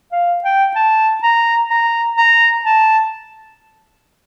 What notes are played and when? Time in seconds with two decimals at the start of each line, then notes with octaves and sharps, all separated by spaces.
0.12 F5
0.44 G5
0.76 A5
1.23 A#5
1.70 A#5
2.18 A#5
2.65 A5